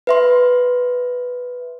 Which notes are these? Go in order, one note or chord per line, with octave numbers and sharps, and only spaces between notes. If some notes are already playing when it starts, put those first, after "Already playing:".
B4 E5 C6